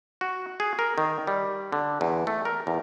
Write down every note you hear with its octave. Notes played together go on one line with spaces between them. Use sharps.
F#4
G#4
A#4
D#3
G3
D3
E2
A3
A#4
E2